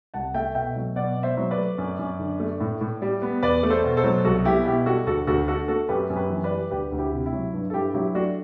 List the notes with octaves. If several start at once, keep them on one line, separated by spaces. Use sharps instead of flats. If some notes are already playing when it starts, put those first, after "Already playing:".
C2 F#5 A5
A3 E5 G5
B2 E5 G5
F#3
B2 D5 F#5
B2
C5 E5
F#3
B4 D5
A3
F#2
F#2
D3
A3
A2
A2
G3
B3
E2 B4 D5
A3
A4 C5
B2
A4 C5
F#3
C2 F#4 A4
B3 E4 G4
B2 E4 G4
G3 F#4 A4
D2 F#4 A4
D2 F#4 A4
D3 F#4 A4
A3 F#4 A4
F#2 G4 B4
F#2
G4 B4
E3
B4 D5
G3
D2 G4 B4
D2
E4 G4
C3
E4
F#3
G2
A4
G2 E4 G4
F#3 E4 G4
A3 D4 F#4